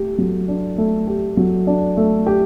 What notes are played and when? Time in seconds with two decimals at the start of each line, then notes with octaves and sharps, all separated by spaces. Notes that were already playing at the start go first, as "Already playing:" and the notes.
Already playing: A3 G4
0.18 F#3
0.48 D4
0.78 A3
1.07 G4
1.37 F#3
1.67 D4
1.97 A3
2.26 G4